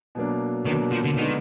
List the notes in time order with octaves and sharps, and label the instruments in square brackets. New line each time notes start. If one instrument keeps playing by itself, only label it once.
[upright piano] B2 F#3 A#3 D4
[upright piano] B2 F#3 A#3 D4 [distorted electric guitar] D#3
[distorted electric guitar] F3
D3
[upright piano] D3 G#3 B3 D4 [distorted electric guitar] D#3